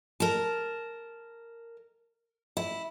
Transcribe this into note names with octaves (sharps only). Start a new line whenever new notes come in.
A#4 A5
E4